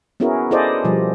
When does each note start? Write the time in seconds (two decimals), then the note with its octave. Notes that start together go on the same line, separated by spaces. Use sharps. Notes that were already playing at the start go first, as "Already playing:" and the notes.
0.20 B3 C#4 E4 F#4 G#4 A#4
0.51 E4 G#4 A4 C5 D5 D#5
0.84 B2 F3 G3